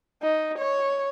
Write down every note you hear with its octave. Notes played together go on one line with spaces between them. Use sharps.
D#4
C#5